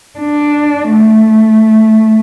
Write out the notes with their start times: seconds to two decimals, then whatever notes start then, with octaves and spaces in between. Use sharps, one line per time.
0.19 D4
0.92 A3